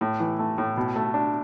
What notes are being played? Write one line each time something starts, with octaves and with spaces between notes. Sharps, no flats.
A2
E3
A3
A2
B2
A3
D4